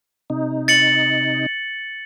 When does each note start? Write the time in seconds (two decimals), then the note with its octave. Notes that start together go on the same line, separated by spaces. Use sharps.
0.30 C3 D#4
0.68 A6 C#7 F#7